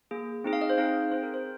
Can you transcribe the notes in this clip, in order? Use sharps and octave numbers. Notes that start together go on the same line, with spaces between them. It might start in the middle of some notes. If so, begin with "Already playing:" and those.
A#3 G#4
C4 D#4 G#4
F5
D#5
C5
C4 D#4 G#4 F5
C4 G#4 C5
A#4
C5